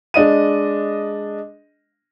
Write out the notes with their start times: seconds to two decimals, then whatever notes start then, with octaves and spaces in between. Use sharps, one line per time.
0.14 G#3 D4 D#5 D#7